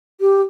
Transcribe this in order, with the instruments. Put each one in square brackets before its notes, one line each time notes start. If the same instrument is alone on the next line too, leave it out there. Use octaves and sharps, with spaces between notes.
[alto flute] G4